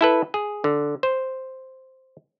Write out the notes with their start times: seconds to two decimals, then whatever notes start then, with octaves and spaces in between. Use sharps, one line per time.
0.01 E4 A4 B4
0.34 G#4
0.64 D3
1.03 C5